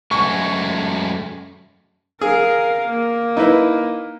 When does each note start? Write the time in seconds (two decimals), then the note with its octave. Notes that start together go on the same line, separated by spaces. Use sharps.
0.11 F#2 G#3 A3 C#6
2.21 G#4 A#4 F5
2.87 A#3
3.37 D#4 E4 B4